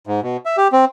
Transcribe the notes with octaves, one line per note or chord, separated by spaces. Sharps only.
G#2
B2
E5
G4
C4